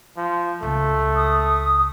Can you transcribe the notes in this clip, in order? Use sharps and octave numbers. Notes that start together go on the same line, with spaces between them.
F3
C#2 A3
D#6